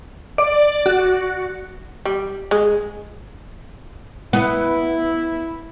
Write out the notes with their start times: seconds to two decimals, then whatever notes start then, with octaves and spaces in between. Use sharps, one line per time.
0.38 D5
0.86 F#4
2.05 G3
2.51 G#3
4.33 B3 E4